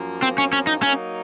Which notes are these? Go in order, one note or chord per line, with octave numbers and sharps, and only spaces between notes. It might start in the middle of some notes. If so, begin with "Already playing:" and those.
Already playing: F#2 F3 A#3
C4
C#4
C#4
D#4
F#3 A#3 C#4 D#4